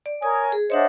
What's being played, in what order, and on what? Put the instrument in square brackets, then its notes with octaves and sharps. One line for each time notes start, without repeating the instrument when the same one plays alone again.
[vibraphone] D5
[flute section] A#4 C#5 G#5 [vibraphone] D#6
[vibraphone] G#4
[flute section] D4 C5 D#5 [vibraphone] C#5 E5 F#5